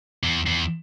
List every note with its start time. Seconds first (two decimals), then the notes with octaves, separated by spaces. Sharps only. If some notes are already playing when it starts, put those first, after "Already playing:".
0.23 E2
0.46 E2